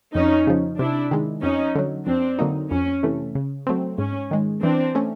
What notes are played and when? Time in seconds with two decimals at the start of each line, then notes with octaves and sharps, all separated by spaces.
0.14 F2 C#4 D#4
0.47 C#3 F3
0.78 C3 D4 E4
1.11 D#3 G#3
1.42 F2 C#4 D#4
1.75 D3 F#3
2.06 F2 C4 D4
2.39 D3 F#3 A#3 D#4
2.71 F2 C#4
3.03 C3 E3 A3
3.35 C#3
3.67 F#3 A3 C4
3.98 G#2 C#4
4.31 D#3 G#3
4.63 E3 C4 D4
4.95 A3 C#4